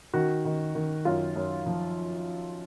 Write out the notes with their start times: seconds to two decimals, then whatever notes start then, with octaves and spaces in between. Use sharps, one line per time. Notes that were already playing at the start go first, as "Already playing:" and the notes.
0.14 D#3 F#4
0.45 D#3
0.75 D#3
1.05 F#2 F4
1.36 F#2
1.66 F3